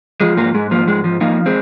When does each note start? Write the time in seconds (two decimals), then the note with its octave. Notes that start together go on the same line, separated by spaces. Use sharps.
0.21 F3 G#3
0.37 G#2 A#3
0.54 G#2 G#3
0.71 F3 A#3
0.87 G#2 G#3
1.04 F3
1.21 F3 A#3 D#4
1.46 G#3 C4